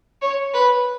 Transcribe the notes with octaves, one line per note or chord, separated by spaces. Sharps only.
C#5
B4